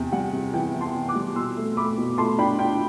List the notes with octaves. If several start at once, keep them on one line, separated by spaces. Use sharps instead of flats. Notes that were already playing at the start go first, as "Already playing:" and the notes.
Already playing: E2 C3 G5
G3 F#5
C3
E3 G5
E3
A5 C6
C3
D6 F#6
G3
B2 C6 E6
A3
A3 B5 D6
B2
A3 A5 C6
D4 G5 B5
D4 G5